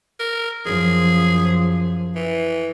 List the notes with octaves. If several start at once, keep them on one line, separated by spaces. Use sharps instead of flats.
A#4
F#2 F3 G#4
E3